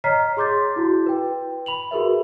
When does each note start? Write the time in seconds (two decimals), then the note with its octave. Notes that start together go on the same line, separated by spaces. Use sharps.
0.04 C#5 D#5 A#5 F6 B6 C7
0.37 G#4 C6 D6 G6 A6
0.76 E4 F#4
1.06 B4 G5
1.66 B5 F7 F#7
1.91 F#4 G#4 A#4 B4 E5